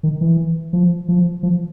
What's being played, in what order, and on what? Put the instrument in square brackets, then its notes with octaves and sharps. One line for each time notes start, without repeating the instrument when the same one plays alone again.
[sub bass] D#3
E3
F3
F3
F3